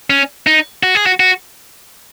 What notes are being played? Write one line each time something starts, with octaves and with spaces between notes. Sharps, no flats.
C#4
D#4
F#4
G#4
F#4
F#4